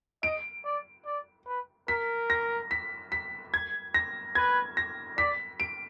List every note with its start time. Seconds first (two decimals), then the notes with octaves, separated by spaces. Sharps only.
0.23 D#5 D7
0.65 D5
1.06 D5
1.47 B4
1.88 A#4 B6
2.30 A#6
2.71 B6
3.12 B6
3.54 G#6
3.94 A#6
4.35 B4 G#6
4.77 A#6
5.18 D5 B6
5.60 D7